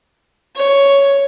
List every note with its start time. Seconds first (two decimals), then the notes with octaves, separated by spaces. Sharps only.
0.56 C#5